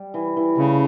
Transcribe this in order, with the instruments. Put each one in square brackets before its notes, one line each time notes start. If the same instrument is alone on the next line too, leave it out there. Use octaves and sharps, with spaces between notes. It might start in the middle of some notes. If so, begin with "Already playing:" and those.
Already playing: [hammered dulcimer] G3
E3
E3
[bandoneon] C#3 [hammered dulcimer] A3